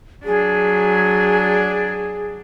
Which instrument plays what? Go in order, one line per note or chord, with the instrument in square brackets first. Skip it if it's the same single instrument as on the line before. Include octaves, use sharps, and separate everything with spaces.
[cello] F#3 D4 [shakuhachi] G#4